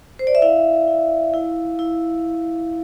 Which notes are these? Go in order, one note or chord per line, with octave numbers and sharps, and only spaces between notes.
C5
D5
E5
E4 F5
E4
E4
E4